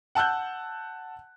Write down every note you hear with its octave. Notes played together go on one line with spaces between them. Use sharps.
F#5 A5 E6 F#6 G6